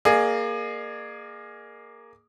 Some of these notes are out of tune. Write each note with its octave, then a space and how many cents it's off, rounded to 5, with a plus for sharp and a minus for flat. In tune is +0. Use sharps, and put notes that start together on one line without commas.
A#3 +0 G#4 +0 D5 +45